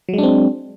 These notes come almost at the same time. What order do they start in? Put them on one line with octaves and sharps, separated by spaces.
F#3 G#3 D4 C4